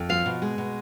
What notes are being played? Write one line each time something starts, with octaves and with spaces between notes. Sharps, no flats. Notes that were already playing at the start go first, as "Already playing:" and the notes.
Already playing: F2
F3 F5
B2
G#3
B2